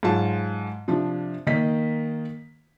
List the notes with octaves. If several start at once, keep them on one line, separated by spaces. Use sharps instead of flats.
G#2 F#3 F4 A5
C3 F3 D4
D#3 A#3 D#5 B6